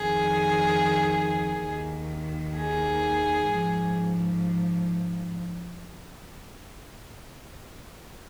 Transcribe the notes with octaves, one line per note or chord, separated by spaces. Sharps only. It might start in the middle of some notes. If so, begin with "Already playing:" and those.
Already playing: F2 D#3 G#4
D#2 D#3
G#4
G#2 F3